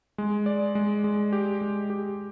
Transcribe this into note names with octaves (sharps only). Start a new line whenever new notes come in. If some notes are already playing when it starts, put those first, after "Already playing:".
G#3
D5
G#3
G#3
G4
G#3
G4